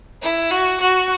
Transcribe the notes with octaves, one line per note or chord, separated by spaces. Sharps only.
E4
F#4
F#4